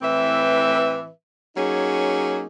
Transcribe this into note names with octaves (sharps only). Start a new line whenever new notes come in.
A2 E3 C4 B4 E5
F#3 A#3 C#4 D#4 G#4